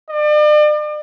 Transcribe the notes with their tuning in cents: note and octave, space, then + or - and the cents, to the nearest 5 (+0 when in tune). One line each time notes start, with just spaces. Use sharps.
D5 +40